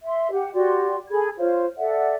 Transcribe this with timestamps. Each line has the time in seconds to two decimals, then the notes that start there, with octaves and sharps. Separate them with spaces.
0.03 E5 C6
0.31 G4 F#5
0.54 F#4 G4 D5 C6
1.10 G#4 A4 B5 G#6
1.37 F4 C5 C#5
1.77 A4 D5 E5 F#5